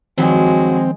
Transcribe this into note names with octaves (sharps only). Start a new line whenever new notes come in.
G2 D#3 F3 F#3 G#3 C4 F#4